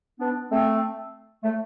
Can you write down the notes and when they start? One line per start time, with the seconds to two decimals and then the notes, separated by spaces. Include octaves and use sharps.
0.19 B3 D4
0.50 A3 C4
1.43 A3